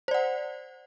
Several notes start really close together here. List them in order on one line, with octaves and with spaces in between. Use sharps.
C5 D5 F#5